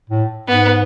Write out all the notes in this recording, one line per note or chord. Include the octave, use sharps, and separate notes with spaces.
A2
G#2 B3